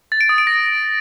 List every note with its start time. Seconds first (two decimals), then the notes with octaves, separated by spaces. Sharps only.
0.12 A6
0.21 D7
0.29 D#6
0.38 D7
0.47 A#6